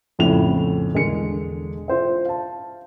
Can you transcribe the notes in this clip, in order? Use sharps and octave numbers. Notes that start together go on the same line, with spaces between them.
A#1 F2 A2 C#3 F7
E1 D3 G#3 A#4 C#7
F4 C5 E5
F5 A5